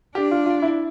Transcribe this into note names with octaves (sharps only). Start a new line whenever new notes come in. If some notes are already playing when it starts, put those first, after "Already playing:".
D4 G4
F4
F4
E4